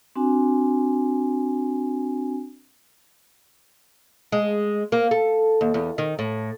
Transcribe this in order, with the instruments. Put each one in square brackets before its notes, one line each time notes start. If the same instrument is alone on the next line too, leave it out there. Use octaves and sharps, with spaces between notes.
[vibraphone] C4 D4 F#4 G#5
[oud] G#3
A#3
A4
D#2
E2
D#3
A2